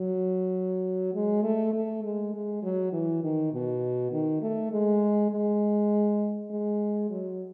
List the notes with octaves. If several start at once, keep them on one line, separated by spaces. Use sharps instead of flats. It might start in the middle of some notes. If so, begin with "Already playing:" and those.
Already playing: F#3
G#3
A3
A3
G#3
G#3
F#3
E3
D#3
B2
D#3
A3
G#3
G#3
G#3
F#3